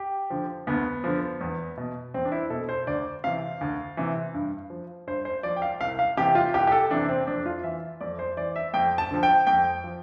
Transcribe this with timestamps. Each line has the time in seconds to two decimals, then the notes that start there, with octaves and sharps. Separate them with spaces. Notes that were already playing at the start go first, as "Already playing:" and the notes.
Already playing: G4
0.30 D3 F3
0.67 D2 B3
1.04 D3 F3
1.41 E2
1.77 B2
2.14 E2 C4
2.25 D4
2.32 E4
2.50 B2 A4
2.69 C5
2.87 D2 D5
3.24 C3 E3 F5
3.61 D2
3.97 C3 E3
4.34 G2
4.70 F3
5.07 G2 C5
5.25 C5
5.43 F3 D5
5.56 G5
5.62 F5
5.80 C2 F5
5.99 F5
6.17 C3 E3 G4
6.35 F4
6.54 C2 G4
6.67 G4
6.72 A4
6.91 C3 E3 D4
7.09 C4
7.27 F2 D4
7.46 F4
7.64 E3 E5
8.01 F2 D5
8.19 C5
8.37 E3 D5
8.56 E5
8.74 F2 G5
8.98 A5
9.11 D3 F3
9.23 G5
9.47 F2 G5
9.84 F3